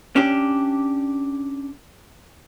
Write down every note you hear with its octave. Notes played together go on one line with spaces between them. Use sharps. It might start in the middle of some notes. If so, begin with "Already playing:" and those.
C#4 D4 G4